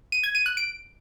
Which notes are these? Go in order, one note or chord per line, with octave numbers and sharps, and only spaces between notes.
D#7
G#6
D#7
F#6
D7